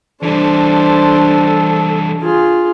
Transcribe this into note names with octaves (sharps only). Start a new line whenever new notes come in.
E3 G3 D4 A4 C5
F4 G#4